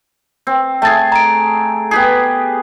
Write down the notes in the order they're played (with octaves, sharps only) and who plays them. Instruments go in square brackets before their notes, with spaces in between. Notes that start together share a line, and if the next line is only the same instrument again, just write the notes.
[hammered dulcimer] C4
[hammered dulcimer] A3 G#4 [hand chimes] G5 A5 A6
[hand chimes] A#5 D7
[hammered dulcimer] B3 G4 G#4